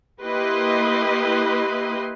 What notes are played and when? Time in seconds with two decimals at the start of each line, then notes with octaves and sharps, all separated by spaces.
0.23 A#3 E4 G4 B4 D#5 C6